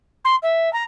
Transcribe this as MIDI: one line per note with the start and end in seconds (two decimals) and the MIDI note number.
0.25 0.36 84
0.43 0.72 76
0.73 0.84 82